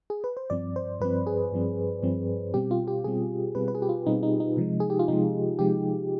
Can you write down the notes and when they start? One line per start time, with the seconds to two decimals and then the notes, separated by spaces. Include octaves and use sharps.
0.10 G#4
0.24 B4
0.37 C5
0.50 G2 F3 C4 D5
0.76 C5
1.00 G2 F3 C4 B4
1.27 G#4
1.52 G2 F3 C4
2.03 G2 F3 C4
2.54 B2 G3 C4 G4
2.71 F4
2.88 G4
3.04 B2 G3 C4 G#4
3.55 B2 G3 C4 B4
3.68 B4
3.75 G#4
3.82 G4
3.89 F4
4.06 B2 G3 C4 D#4
4.23 D#4
4.40 D#4
4.57 C3 F3 G#3
4.80 G#4
4.90 G4
4.99 F4
5.08 C3 F3 G#3 D#4
5.59 C3 F3 G#3 G4